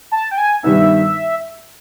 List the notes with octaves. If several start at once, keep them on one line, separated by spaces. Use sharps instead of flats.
A5
G5
G#5
G2 D#3 G3 B3 D#4 E5